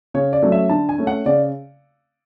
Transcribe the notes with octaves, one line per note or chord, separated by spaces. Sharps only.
C#3 C#5
D5
F#3 A3 C#4
E5
D3 A5
G#5
A3 C#4
F#5
C#3 D5